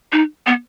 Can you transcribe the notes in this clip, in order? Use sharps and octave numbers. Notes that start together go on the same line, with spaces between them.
D#4
B3